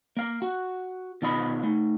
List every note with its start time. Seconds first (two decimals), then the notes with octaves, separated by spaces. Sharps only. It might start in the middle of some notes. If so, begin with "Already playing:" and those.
0.17 A#3 F5
0.42 F#4
1.22 B2 D#3 F4 D#5 B5
1.63 A3 D#4